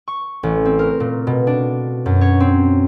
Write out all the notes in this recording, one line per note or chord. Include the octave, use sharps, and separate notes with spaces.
C#6
A1
C4
A#4
A#2
B2
D4
F#2
C#5
C4